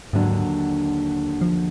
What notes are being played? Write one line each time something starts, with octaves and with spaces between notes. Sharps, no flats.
D#2 G#2 D3 F#3 D4
F3